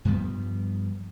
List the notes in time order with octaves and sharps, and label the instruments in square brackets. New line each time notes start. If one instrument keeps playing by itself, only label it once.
[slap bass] G2 F3 G3 B3